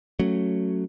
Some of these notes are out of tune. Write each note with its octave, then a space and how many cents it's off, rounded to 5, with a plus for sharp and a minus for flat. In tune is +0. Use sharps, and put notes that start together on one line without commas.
F#3 +0 A3 +0 C#4 +0